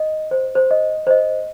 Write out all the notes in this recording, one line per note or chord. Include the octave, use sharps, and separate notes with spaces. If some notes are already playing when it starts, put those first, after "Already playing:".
Already playing: D#5
C5
C5
D#5
C5
D#5